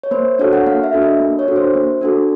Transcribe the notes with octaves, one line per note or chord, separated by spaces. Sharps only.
C#5
A#3 C5
D4 F#4 A4 C#5
F#5
A#3 F5
E5
D4 F#4 A4
D#5
A#3
C#5
D4 F#4 A4
C5
A#3
D4 F#4 A4